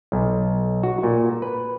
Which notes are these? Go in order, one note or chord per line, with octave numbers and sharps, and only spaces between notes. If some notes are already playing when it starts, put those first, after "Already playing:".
B1
F#4
A#2
B4